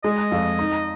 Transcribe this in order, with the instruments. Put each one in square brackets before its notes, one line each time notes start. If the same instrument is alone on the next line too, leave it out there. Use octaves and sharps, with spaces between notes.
[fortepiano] G#3 [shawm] D#5
[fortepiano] F2
D#4